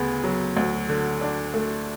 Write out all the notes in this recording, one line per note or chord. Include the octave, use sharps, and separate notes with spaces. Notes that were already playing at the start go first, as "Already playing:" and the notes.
Already playing: D2 C#3 B3
F#3
D2
D3
D4
A3